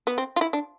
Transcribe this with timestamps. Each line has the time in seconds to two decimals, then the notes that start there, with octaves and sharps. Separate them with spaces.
0.07 B3
0.18 C4
0.36 F4
0.41 E4
0.53 D4